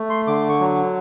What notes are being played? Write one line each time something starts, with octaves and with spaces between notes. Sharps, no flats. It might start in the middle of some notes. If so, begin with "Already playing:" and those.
Already playing: A3
C6
D3 D6
C#6
F#3